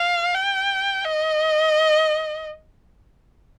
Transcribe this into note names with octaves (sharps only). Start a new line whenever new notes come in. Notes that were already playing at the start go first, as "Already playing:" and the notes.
Already playing: F5
G5
D#5